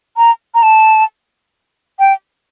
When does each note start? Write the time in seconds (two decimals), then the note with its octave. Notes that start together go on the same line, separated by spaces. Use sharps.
0.17 A#5
0.54 A#5
0.63 A5
1.99 G5